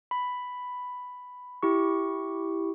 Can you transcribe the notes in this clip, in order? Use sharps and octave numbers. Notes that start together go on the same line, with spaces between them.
B5
E4 G4 C#6